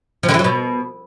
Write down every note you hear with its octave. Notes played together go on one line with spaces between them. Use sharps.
F3
D3
E3
F#3
B2